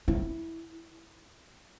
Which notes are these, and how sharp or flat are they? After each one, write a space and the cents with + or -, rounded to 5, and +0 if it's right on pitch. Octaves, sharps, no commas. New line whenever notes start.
E4 -5